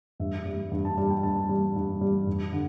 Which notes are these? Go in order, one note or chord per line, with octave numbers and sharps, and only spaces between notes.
G2 E5
G3
G2
A5
G3 A5
G5
G2 A5
G3
G2
G3
G2
D3